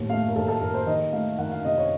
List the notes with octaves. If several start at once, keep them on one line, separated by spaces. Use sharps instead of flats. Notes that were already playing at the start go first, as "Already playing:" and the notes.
Already playing: D#2 A2
A3 F5
A#4
D#2 A4
A4
D#2 A#4
C5
D#3 D#5
A3 F5
D#3 F#5
F5
C3 D#5
C#5